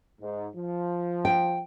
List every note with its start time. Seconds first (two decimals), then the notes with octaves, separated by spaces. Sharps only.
0.21 G#2
0.56 F3
1.25 G5